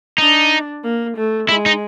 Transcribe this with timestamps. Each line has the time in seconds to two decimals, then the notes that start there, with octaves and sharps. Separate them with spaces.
0.18 D4 D#4
0.83 A#3
1.17 A3
1.49 G#3 E4
1.66 D#4